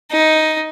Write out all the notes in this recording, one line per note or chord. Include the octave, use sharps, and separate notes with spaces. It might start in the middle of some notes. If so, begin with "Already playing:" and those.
D#4